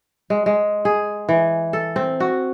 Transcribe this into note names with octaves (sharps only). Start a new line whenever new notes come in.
G#3
G#3
G#4
E3
A4
C4
F#4